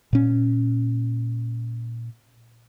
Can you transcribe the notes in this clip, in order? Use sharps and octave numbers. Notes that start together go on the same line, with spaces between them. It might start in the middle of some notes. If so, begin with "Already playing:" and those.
A#2 C#4